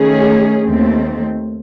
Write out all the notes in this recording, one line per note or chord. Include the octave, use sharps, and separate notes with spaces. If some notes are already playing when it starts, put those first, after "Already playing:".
Already playing: D#3 A3 C#4 G#4
D#2 D#3 A3 C4